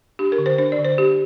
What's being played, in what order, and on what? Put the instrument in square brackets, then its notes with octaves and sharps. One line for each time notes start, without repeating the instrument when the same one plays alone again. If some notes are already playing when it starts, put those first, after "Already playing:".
[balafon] D4 G4
A#4
D3
C5
D4 C5
D5
D3
C5
D4 G4